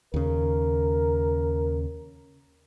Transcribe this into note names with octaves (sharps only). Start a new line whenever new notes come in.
D#2 C#3 A#4